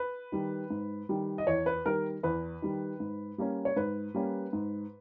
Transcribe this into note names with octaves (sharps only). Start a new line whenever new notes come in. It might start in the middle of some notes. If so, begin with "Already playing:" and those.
Already playing: B4
D#3 G3
G#2
D#3 G3
D#5
E2 C#5
B4
D#3 G3 A#4
E2 B4
D#3 G3
G#2
G3 A#3 C#4
C#5
G#2 B4
G3 A#3 C#4
G#2